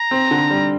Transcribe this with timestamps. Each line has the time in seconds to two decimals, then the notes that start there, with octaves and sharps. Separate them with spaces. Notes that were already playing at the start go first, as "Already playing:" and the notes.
Already playing: A#5
0.11 C4
0.31 D3
0.51 G3